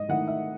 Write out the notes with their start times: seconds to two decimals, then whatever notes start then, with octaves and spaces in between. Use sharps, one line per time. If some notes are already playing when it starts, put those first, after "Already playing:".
Already playing: G#2 D#5
0.09 D#3 A3 E4 F#5
0.28 E5